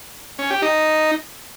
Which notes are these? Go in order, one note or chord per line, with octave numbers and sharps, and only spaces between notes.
C#4
G4
D#4